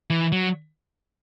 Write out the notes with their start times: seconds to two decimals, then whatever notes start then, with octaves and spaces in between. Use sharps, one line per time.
0.10 E3
0.32 F#3